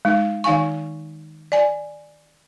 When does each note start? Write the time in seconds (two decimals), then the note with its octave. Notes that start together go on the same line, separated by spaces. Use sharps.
0.05 G#3 D#4
0.44 D#3 D#4 F5 G#5 C#6
1.52 D5 G#5